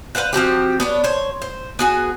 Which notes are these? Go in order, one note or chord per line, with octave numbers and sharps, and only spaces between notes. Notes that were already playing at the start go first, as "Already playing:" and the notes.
B4 C5 F5 F#5
F3 C4 F#4 G4
B3 D4 C#5
C5 C#5
C5
B3 F#4 G#4